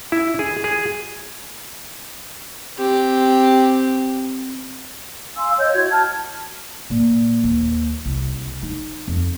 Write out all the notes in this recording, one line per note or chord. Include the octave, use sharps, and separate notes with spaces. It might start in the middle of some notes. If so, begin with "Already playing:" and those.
E4
G#4
G#4
C4 G4
F5 G#5 C6 E6
C#5 D#5 G6
E4 F#4 G#6
A5 F6
A#2
D#2
C2
D#4
F2